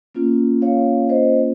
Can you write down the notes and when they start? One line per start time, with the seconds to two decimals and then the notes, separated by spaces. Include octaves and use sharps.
0.15 A#3 C#4 F4
0.62 C#5 F5
1.09 C5 D#5